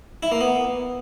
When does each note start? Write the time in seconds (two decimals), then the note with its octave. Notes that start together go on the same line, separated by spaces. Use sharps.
0.23 E4
0.32 A#3
0.41 B3